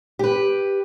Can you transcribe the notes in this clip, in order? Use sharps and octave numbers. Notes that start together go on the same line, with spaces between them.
G4 B4